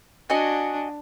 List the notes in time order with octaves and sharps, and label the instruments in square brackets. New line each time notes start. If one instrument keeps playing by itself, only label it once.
[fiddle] D4 [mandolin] F#4 D#5 G#5